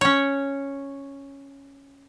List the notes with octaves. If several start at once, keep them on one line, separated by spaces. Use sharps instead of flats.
C#4 C#5